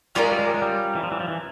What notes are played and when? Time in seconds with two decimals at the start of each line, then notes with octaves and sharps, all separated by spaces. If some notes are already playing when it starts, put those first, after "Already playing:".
0.15 G3 C#4 F4 A#4 D5
0.24 G#3
0.32 G3
0.39 G#3
0.47 G3
0.54 G#3
0.62 G3
0.95 E3
1.03 F3
1.11 E3
1.20 F3
1.28 E3